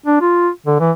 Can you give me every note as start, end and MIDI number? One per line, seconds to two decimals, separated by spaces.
0.06 0.19 62
0.21 0.49 65
0.66 0.78 50
0.80 0.92 52